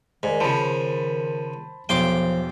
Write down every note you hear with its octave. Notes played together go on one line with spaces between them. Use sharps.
G#2 D#3 D5 G#5
C#3 F3 C5 A5 B5
B1 E2 F3 G5 C6 D6